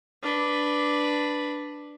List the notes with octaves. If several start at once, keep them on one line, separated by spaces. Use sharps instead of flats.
D4 B4